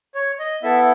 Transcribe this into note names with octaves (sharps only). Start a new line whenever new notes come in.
C#5
D#5
B3 E4 A4 E5